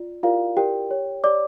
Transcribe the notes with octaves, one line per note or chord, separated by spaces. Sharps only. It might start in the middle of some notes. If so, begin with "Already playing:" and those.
Already playing: F4 D5
E4 F4 G4 A#4 D5 F5
E4 G4 A#4 D5 G5
G4 C#5
G4 C#5 D5 D6